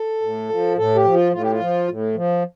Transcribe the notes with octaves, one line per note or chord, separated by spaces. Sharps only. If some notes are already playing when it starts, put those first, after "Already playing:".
Already playing: A4
A2
F3
A2 A4
G4
F3
F4
A2 F4
G4
F4
F3
A2
F3